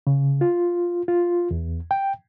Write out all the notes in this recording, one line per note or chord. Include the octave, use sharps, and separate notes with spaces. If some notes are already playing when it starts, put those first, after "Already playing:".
C#3
F4
F4
E2
G5